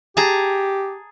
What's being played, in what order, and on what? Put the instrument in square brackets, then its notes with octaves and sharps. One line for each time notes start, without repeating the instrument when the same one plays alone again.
[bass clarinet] G4 [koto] G#4 A5 A#5